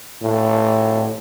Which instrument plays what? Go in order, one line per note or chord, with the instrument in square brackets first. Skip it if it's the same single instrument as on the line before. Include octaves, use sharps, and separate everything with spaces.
[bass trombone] A2